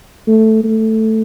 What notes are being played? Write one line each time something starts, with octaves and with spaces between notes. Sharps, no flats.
A3
A3